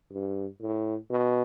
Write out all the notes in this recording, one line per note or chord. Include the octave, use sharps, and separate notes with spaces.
G2
A2
B2